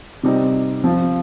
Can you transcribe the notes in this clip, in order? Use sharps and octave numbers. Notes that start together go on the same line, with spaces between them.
C3 G3 C4 D#4
F3 C4 F4